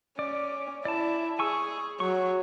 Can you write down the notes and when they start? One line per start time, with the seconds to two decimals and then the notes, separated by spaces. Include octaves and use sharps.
0.19 C#4 D5
0.85 E4 D5 A5
1.39 G#4 G#5 C#6 E6
2.00 F#3 C#6